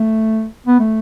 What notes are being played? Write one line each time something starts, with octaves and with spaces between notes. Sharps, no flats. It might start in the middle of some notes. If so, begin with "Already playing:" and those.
Already playing: A3
B3
A3